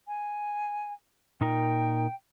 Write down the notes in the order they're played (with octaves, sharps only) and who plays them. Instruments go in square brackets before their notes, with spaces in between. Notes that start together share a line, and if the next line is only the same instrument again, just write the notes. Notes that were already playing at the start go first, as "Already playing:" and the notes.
[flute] G#5
[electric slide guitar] A#2 D#4 A#4 [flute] G5